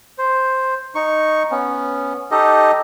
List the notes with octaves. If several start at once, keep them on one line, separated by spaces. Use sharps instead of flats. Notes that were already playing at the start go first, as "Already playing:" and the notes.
C5
D#4 C#6
B3 C#4
D#4 G4 A4 D#5